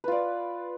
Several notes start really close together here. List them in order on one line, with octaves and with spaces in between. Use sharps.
B4 F4 D5